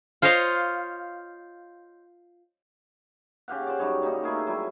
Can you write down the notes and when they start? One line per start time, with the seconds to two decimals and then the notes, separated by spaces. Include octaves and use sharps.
0.22 F4 C5 C#5 D#5 F5
3.48 C#3 G4 F5 F#5
3.66 C5 D5
3.79 F#2 G3 D#4 C#5
4.02 D#3 G3 A#3 D#4
4.24 A3 E4 G#4 A#4
4.47 F#3 G3 E4 G#4